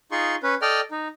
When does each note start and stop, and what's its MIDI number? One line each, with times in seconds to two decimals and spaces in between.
0.11 0.35 63
0.11 0.35 65
0.11 0.35 68
0.11 0.35 84
0.11 0.35 85
0.43 0.55 61
0.43 0.55 71
0.62 0.80 69
0.62 0.80 74
0.62 0.80 75
0.62 0.80 79
0.62 0.80 89
0.91 1.08 63